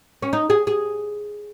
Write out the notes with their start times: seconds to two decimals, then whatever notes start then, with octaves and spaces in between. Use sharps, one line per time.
0.22 C#4
0.33 D#4
0.50 G#4
0.67 G#4